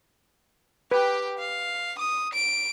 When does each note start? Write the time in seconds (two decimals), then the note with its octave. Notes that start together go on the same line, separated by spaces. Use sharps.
0.91 G4 B4 G5
1.39 F5
1.99 D#6
2.33 D7